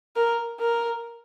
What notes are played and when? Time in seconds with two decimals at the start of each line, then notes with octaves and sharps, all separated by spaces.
0.16 A#4
0.61 A#4